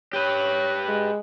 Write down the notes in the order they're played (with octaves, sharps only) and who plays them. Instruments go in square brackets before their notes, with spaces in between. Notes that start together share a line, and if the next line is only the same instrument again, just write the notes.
[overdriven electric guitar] G4 B4 [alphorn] C#5
[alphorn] G#3